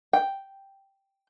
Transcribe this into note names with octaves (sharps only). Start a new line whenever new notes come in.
G5